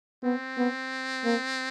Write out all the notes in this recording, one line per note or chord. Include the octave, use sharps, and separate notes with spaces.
B3 C4
B3
A#3